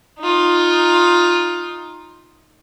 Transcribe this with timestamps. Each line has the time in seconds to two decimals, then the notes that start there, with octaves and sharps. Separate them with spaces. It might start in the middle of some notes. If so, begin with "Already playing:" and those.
0.20 D#4 F4